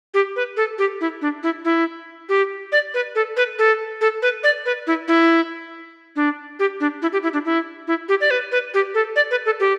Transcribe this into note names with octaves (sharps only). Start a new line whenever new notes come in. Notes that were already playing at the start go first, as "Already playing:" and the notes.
G4
B4
A4
G4
E4
D4
E4
E4
G4
D5
B4
A4
B4
A4
A4
B4
D5
B4
E4
E4
D4
G4
D4
E4
G4
E4
D4
E4
E4
G4
D5
B4
B4
G4
A4
D5
B4
A4
G4